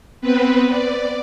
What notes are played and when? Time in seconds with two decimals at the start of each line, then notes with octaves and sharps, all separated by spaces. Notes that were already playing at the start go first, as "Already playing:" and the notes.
0.21 B3 C4 B4
0.69 D5